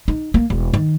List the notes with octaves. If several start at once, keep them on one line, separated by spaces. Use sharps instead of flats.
D#4
A#3
E1
D#3